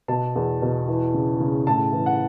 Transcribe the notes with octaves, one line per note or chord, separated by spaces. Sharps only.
B2 A5
E2
B2
E3
C#3
C#3
A2 A5
E3
F#5